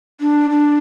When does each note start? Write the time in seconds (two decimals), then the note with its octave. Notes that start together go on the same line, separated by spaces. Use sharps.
0.21 D4
0.50 D4